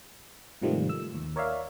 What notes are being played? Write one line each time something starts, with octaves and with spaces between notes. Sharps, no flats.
G#2 C3 D#3 F3 G3 A3
E6
D#2
A#4 C#5 D5 E5 F5